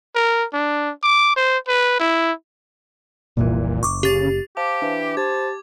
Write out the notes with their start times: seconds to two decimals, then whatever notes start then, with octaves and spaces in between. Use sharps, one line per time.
0.15 A#4
0.54 D4
1.03 D6
1.36 C5
1.68 B4
2.00 E4
3.37 F1 C2 A#2 E3
3.83 F#1 C#6 D6
4.03 C#3 G4 A6
4.57 G4 C5 F5 A5 D6
4.82 E3 D4
5.17 G4 C5 A5 G#6